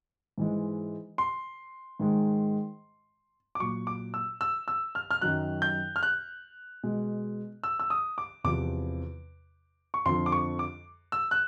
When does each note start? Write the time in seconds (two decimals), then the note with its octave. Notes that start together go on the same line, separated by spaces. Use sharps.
0.38 G#2 E3 G#3
1.18 C6
2.00 G#2 D#3 G#3
3.55 D6
3.60 A#2 F#3 C#6
3.87 D6
4.14 E6
4.41 E6
4.68 E6
4.95 F6
5.11 F6
5.21 F#2 D#3 F#3 F#6
5.62 G6
5.96 F6
6.03 F#6
6.83 B2 G#3
7.64 E6
7.80 E6
7.90 D#6
8.18 D6
8.44 E2 C3 F3 D6
9.94 C#6
10.06 F2 D3 F3 C6
10.26 D6
10.32 C#6
10.59 D6
11.12 E6
11.31 F#6